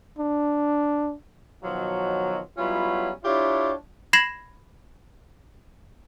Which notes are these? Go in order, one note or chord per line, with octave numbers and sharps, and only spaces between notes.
D4
B2 D#3 F3 F#3
F#3 G3 B3 C#4 E4 F4
D4 E4 F4 G4 C#5
B5 G#6 A#6 C7 E7 F#7